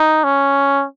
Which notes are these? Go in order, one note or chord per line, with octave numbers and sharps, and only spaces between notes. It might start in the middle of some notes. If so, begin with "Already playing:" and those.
Already playing: D#4
C#4